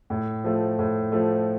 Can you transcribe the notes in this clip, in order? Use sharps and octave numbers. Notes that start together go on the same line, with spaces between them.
A2
F3 A3
A2
F3 A3